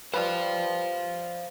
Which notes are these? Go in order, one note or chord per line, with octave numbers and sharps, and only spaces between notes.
G3 B4 C5 F5